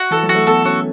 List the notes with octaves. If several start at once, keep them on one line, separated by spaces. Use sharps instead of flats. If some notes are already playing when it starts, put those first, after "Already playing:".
Already playing: F#4
E3 A4
F#3
F#4
A3
B3 A4
C#4 F#4